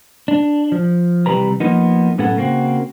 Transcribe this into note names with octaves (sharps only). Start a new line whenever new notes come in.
D4
F3
C3 D#3 E3 G3 B4 A#5
F3 A#3 B3 D#4
F#2 A2 B3 C#4 A4 F#5
C#3 A#3 C4 F#4